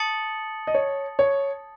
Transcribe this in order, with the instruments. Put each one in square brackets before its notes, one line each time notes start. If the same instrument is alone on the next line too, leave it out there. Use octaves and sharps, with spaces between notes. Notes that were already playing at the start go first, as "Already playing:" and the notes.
Already playing: [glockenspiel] A5 D#6 A6 C#7 F#7
[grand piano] D#5
C#5
C#5